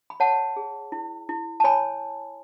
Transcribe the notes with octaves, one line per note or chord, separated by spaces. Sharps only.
B5
C#5 F#5 A5
G#4
E4
E4
A5
C#5 G#5 B5